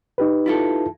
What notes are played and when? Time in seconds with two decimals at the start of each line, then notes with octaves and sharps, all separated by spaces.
0.18 D#4 G4 B4
0.46 E4 F4 A4